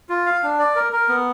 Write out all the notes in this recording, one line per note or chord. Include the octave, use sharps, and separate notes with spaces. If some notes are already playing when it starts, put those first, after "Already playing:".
F4
F5
D4
D5
A#4
A#4
B3